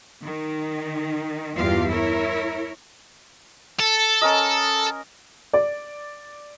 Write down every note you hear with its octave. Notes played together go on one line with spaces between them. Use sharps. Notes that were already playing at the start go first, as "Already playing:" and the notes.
D#3
E2 G2 F4 G4 F5
E4 A#4 C#5
A4
C#4 A#4 D#5
D5